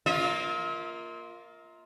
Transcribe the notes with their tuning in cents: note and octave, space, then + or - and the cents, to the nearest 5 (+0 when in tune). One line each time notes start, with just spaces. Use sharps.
A#3 +0 F4 +0 E5 -45